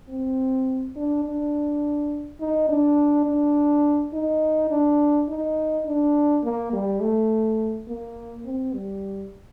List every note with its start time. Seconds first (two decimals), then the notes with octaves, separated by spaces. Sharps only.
0.09 C4
0.96 D4
1.24 D4
2.40 D#4
2.69 D4
3.26 D4
4.13 D#4
4.70 D4
5.29 D#4
5.86 D4
6.43 A#3
6.73 G3
7.01 A3
7.88 A#3
8.46 C4
8.74 G3